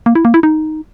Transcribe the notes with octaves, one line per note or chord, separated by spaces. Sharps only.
A#3
E4
A#3
E4
D#4